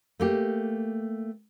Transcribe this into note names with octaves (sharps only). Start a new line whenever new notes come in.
A3 A#3 G4